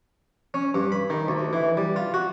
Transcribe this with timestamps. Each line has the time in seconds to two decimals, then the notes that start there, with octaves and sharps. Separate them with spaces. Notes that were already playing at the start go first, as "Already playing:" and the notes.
0.54 C#4
0.74 G2
0.92 B5
1.10 D#3
1.28 D2
1.53 E3
1.77 G3
1.96 F4
2.14 F#4